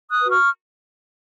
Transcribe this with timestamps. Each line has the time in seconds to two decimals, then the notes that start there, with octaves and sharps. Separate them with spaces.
0.10 D#6 F#6
0.21 F#4 B4
0.30 C#6 F6